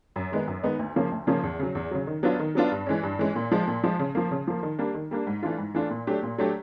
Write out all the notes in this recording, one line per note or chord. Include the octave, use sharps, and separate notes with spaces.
F#2
D#3 G#3 B3 D#4
F#2
D#3 G#3 B3 D#4
D2
C#3 F3 A#3 C#4
D2
C#3 F3 A#3 C#4
E2
C#3 F#3
E2
C#3 F#3
D#3
F#3 B3 D4 F4
D#3
F#3 B3 D4 F4
G2
E3 G#3 C#4
G2
E3 G#3 C#4
A#2
F3 G#3
A#2
F3 G#3
C#3
F3 A#3
C#3
F3 A#3
D#3
G3 A#3 D4
D#3
G3 A#3 D4
G#2
E3 A3 D4 F4
G#2
E3 A3 D4 F4
A#2
F#3 A3 D4 G4
A#2
F#3 A3 D4 G4